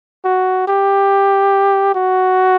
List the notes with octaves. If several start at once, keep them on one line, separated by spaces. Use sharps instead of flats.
F#4
G4
F#4